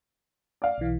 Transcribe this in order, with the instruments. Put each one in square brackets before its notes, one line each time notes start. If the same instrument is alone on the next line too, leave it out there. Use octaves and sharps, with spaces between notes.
[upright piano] D5 F5
[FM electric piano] B1 E3